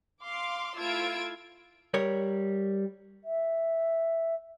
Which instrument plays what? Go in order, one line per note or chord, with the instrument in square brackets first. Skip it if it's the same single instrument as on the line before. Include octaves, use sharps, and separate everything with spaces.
[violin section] F5 C6 D6
A3 E4 F4 E6 G#6 D7
[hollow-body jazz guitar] G3 A#4 C#5
[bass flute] E5